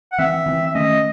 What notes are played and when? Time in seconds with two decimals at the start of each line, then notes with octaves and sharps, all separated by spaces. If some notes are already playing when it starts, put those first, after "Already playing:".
0.12 F#5
0.18 E3 C4 E5
0.46 E3 C4
0.67 E5
0.75 D#3 A3 C#4 D#5